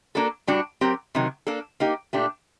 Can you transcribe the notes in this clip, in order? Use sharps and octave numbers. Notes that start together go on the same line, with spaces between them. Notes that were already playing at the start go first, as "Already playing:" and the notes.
A#3 D4 F#4 A4
A2 G3 D4 F#4
F#3 C4 G4 A#4
C3 D#3 F#3
A#3 D4 A4
A#3 D#4 G4
A#2 A3 D4 G4